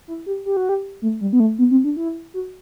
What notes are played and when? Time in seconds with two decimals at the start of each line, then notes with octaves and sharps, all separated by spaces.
0.08 E4
0.26 G4
0.46 G4
0.57 F#4
0.69 G4
1.02 A3
1.21 G3
1.33 B3
1.40 A3
1.58 B3
1.71 C4
1.84 D4
1.97 E4
2.34 F#4